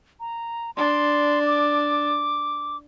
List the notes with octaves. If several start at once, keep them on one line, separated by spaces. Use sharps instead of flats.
A#5
D4 C6
D6